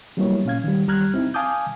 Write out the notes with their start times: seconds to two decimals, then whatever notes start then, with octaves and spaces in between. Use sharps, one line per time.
0.17 F#3 G3 A#3 B3 E4 C#5
0.45 A#2 C#4 F5 G#6
0.64 D#3 G3
0.88 D#2 G3 A#5 F6 F#6 G#6
1.14 C4 D#4 E4
1.34 F5 G#5 A5 D6 D#6 G6